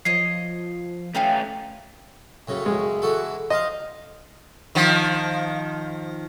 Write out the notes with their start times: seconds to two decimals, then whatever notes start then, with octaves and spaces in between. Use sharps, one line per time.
0.05 F3 C#5 D#5 C7
1.15 A3 C#4 D#4 G4 F5
2.48 F#2 A2 C#3
2.66 G#3
3.02 E3 F#4 A4
3.50 C5 D#5 F5
4.75 D#3 F3